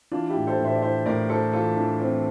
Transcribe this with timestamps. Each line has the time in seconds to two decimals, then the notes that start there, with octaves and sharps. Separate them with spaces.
0.12 E3 D4 F4
0.30 E4 G4
0.36 A2
0.47 A4 C5
0.59 A2
0.64 C5 E5
0.75 D5
0.82 E3 C5 E5
1.06 A2 A#4 D5
1.30 E3 A4 C5
1.53 E3 F4 A4
1.77 E3 D4
2.00 E3 C4